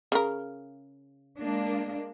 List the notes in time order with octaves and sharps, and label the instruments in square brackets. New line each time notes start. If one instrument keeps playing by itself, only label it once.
[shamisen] C#3 A#4
[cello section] G#3 A#3 D4